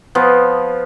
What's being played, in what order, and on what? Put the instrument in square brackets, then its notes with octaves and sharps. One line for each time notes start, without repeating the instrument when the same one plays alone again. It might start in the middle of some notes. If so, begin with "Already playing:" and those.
[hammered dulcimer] F3 B3